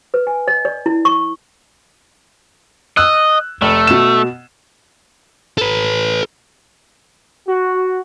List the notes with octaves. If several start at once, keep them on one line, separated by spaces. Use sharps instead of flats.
B4
G#5
D#5
D5
E4
C#6
D#5 E6 F#6
F1 A3
B2 E7
A4 B4
F#4